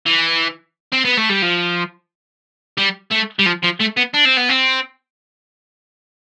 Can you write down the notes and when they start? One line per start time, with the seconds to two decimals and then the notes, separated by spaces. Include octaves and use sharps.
0.06 E3
0.93 C4
1.05 B3
1.18 A3
1.30 G3
1.42 F3
2.78 G3
3.12 A3
3.39 G3
3.46 F3
3.63 F3
3.80 A3
3.97 B3
4.14 D4
4.26 C4
4.37 B3
4.49 C4